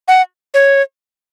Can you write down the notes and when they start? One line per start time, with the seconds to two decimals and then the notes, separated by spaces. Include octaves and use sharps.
0.08 F#5
0.54 C#5